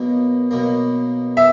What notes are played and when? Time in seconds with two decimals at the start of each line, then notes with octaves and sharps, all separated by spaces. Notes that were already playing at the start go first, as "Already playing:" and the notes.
Already playing: B1 B2 A#3
0.51 B1 B2 A#3
1.37 B3 E5